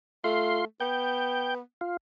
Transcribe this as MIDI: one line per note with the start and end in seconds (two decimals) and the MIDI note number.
0.24 0.63 57
0.24 0.65 65
0.24 0.65 84
0.80 1.60 59
0.80 1.55 79
1.81 1.97 65